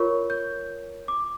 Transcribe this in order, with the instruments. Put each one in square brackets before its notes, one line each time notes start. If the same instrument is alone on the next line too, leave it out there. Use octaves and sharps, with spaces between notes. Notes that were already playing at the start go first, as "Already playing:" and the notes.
Already playing: [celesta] F4 A#4 C#5 C#6
G6
D6